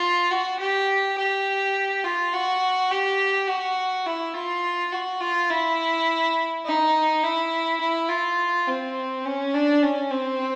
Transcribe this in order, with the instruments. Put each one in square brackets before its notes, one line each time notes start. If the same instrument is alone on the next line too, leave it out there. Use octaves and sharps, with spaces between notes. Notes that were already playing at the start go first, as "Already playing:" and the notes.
Already playing: [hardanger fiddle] F4
F#4
G4
G4
F4
F#4
G4
F#4
E4
F4
F#4
F4
E4
D#4
E4
E4
F4
C4
C#4
D4
C#4
C4